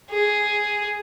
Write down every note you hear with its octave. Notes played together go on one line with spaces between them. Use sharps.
G#4